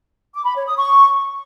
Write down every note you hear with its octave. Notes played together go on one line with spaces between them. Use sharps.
D6
B5
C#5
D#6
C#6